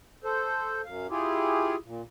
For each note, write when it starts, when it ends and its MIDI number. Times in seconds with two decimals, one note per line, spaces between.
0.24 0.81 69
0.24 0.81 72
0.85 1.07 42
0.85 1.07 77
1.10 1.76 64
1.10 1.76 65
1.10 1.76 67
1.10 1.76 68
1.85 2.02 46